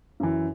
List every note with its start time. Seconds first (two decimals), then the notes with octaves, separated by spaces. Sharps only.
0.20 F#2 E3